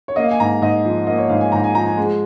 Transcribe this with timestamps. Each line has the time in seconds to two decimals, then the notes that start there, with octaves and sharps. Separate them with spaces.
0.08 C#5
0.16 A#3 D#5
0.24 F5
0.31 G#5
0.40 G#2 A#5
0.62 G#2 D#5
0.85 F3
1.07 A#3 D#5
1.19 C#5
1.29 G#2 F5
1.41 G#5
1.52 G#2 A#5
1.64 G#5
1.75 F3 A#5
1.86 G#5
1.97 G#3